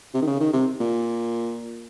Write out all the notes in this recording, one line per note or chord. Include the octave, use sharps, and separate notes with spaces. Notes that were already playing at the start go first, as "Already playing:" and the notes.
C3
D#3
C#3
D#3
C3
A#2